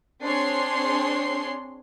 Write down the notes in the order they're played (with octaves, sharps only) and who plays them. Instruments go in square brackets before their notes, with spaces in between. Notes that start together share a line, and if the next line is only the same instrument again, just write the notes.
[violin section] C4 D4 G#4 C#5 C6 C7